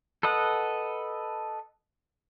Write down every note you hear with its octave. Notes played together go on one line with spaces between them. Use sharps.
A4 B4 D#5 F#5